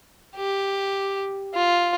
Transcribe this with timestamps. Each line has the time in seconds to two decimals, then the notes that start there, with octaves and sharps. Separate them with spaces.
0.36 G4
1.54 F4